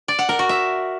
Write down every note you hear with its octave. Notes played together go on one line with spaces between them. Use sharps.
D5
F#5
A#4
F#4
E5